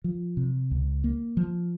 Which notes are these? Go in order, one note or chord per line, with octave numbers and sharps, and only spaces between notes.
F3
C3
C#2
A#3
F3